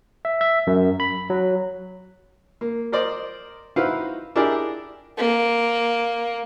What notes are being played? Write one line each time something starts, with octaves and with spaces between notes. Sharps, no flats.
E5
E5
F#2
B5
F#3
A#3
A#4 C5 D5 D#5
D#4 E4 F#4 B4 C5 F5
D4 E4 G4 G#4 A#4 D5
A#3